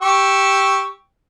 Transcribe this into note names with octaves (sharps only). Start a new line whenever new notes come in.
G4 C#6 E6